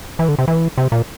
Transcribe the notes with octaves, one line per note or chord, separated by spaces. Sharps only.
E3
D3
C3
E3
C3
A#2